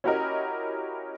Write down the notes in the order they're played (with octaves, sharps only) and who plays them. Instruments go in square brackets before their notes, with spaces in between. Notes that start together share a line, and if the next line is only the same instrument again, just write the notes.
[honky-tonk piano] C#4 E4 F#4 G4 A#4 D#5